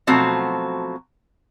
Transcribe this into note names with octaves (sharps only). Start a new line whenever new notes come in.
B2 F3 F#3 A3 C4 F#4